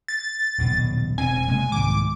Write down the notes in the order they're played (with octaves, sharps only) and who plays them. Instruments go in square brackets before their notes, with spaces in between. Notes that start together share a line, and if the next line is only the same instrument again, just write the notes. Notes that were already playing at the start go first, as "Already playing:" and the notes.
[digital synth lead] A6
[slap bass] D#1 B1 C#3
[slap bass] E1 B2 C4 [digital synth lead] G#5
[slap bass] C3 G#3 A#3
[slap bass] C2 G#2 D#3 [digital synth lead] D6